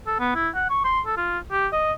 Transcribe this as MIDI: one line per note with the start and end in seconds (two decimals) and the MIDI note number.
0.06 0.17 69
0.20 0.33 59
0.36 0.49 64
0.55 0.66 78
0.70 0.81 85
0.84 1.00 84
1.06 1.17 69
1.17 1.39 65
1.51 1.67 67
1.72 1.93 75